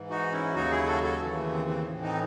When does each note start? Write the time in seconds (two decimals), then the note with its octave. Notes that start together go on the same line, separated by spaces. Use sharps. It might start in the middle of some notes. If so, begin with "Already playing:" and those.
Already playing: G#2 E3
0.10 D#4 F#4
0.32 C#4 E4
0.54 D#2 C#3 F#3 D#4 F#4
0.71 E4 G#4
0.87 F#4 A4
1.03 F#4 A4
1.20 D#2 C#3 E3
1.37 A3
1.53 C4
1.69 C4
1.86 A2 E3
2.02 C4 D#4